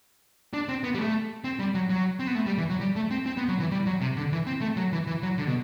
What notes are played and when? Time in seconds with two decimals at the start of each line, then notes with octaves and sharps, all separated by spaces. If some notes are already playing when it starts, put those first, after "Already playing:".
0.53 D4
0.69 C4
0.83 B3
0.95 G3
0.99 A3
1.44 C4
1.59 G3
1.74 F#3
1.90 F#3
2.20 C4
2.27 B3
2.35 A3
2.46 G3
2.58 E3
2.69 F#3
2.81 G3
2.96 A3
3.11 C4
3.26 C4
3.37 B3
3.48 F#3
3.60 E3
3.72 G3
3.86 F#3
4.01 C3
4.17 D3
4.32 E3
4.47 C4
4.62 A3
4.77 F#3
4.92 E3
5.07 E3
5.23 F#3
5.38 D3
5.47 B2